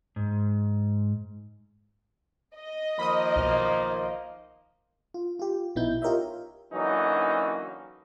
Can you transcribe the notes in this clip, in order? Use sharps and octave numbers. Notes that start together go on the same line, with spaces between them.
G#2
D#5
D#3 F3 A#3 B5 D#6
B1 F6
F4
F4 G4
A#1 B2 B3 D#4 E4 G6
F4 G4 A#4 C#5 D#5 E5
D3 E3 F#3 A#3 C#4 D#4